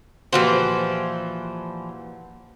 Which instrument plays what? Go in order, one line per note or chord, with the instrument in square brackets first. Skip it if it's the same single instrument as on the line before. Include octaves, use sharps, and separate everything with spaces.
[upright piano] A#2 F#4 G4 [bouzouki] E3 F3 C5